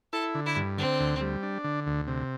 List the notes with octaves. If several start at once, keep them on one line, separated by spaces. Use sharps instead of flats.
E4 A4
D3
E4
G2
D3 C4
D2
G3
D4
D3
D2
C3